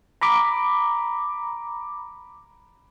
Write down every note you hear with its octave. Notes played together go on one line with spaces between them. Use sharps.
A#5 B5 D6